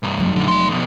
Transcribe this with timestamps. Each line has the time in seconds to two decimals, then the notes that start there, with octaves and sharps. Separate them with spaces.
0.03 C2 G2
0.18 F1 F#3
0.36 A#2 D3
0.48 G3 C6
0.69 F2 B2